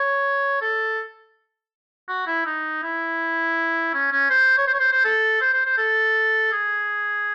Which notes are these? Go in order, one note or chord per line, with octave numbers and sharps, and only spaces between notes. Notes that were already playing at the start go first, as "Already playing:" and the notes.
Already playing: C#5
A4
F#4
E4
D#4
E4
C#4
C#4
C5
C#5
C5
C#5
C5
C5
A4
C5
C5
C5
A4
G#4